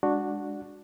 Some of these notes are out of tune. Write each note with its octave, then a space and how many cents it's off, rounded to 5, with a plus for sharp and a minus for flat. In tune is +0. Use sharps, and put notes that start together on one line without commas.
G#3 -20 D4 +0 F#4 -5